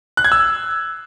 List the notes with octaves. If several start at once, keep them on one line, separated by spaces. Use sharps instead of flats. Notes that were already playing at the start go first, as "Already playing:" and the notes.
F#6
G#6
E6